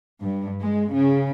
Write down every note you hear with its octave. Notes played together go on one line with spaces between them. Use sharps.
G2
G#3
C#3